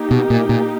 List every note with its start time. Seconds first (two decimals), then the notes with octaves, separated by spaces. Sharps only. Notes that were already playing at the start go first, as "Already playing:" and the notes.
Already playing: A#3 D#4 G4
0.11 B2
0.30 A#2
0.49 A#2